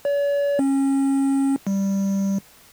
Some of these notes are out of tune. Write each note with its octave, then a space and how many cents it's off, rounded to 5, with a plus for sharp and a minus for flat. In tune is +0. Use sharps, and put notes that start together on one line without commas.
C#5 +45
C#4 -25
G3 +0